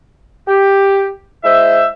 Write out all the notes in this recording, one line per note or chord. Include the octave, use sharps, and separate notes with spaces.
G4
G#3 E4 C5 E5